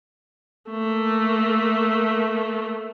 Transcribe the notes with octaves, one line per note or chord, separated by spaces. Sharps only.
A3 A#3